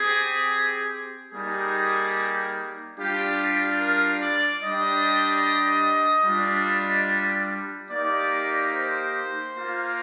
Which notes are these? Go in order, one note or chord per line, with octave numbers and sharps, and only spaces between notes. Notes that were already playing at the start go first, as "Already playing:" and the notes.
Already playing: C4 G4 G#4
G3 A#3 D#4 G4 G#4
G3 D4 F4 G4
A#4
D5
G3 D4 G4 D#5
G3 D4 F4
A#3 D#4 G4 D5
C5
A#3 F4